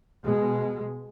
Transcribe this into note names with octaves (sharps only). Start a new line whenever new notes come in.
B2 G#3